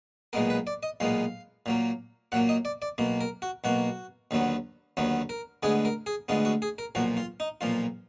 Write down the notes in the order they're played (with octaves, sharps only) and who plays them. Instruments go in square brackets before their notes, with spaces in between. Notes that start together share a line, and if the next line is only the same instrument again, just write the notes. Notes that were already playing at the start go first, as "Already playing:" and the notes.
[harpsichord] B1 A#2 G#3 B3 A#4
B4
D5
D#5
B1 A#2 G#3 B3 F5
A#2 F#3 A#3
A#2 F#3 A#3 F#5
D#5
D5
D5
B1 B2 A#3
A#4
F#4
B1 B2 A#3 F#4
D#2 D3 F#3 B3
D#2 D3 F#3 B3
A#4
D2 D3 G#3 B3 G#4
A#4
G#4
D2 D3 G#3 B3 F4
F#4
G#4
A#4
B1 A#2 F3 F#4
F4
D#4
B1 A#2 F3 F4